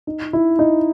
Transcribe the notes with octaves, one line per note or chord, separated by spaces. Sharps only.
D#4
E4
D#4